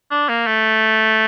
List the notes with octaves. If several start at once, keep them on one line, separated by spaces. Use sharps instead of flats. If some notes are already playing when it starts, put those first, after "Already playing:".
D4
A#3
A3